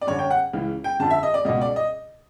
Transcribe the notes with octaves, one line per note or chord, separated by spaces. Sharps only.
D5
F#2 D3 C#5
G5
F#5
C#2 C#3 E3
G5
F2 D3 A5
E5
D#5
D5
C#2 B2 D#5
D5
D#5